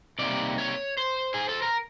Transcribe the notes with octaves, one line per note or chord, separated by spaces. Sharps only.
C3 D#3 G3 A#3 D5
C#5
C5
G#4
A4
A#4